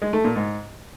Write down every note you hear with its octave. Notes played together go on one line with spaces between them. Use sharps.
G#3
A3
A#2
G#2